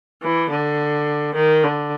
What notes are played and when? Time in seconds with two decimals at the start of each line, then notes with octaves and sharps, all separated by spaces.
0.22 E3
0.50 D3
1.35 D#3
1.63 D3